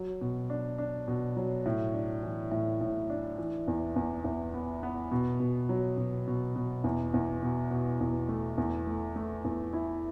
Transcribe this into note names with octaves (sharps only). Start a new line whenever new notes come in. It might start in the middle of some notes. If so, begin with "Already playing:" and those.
Already playing: F#3
B2
D4
D4
B2
F#3
A2
D4
E3
A2
A2
D4
E3
E2
E2
E2
B3
B3
B2
B2
F#3
B2
B2
B2
E2
E2
B2
B2
E2
A3
E2
A3
A3
E2
E4